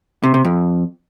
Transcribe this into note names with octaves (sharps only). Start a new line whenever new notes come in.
C3
C3
F2